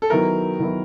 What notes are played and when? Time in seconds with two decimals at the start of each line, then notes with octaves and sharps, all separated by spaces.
0.02 A4
0.10 D#3 F#3 B3 E4 A#4
0.60 D#3 F#3 B3 E4